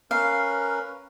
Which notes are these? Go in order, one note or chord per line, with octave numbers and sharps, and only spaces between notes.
C#4 A#4 B4 F5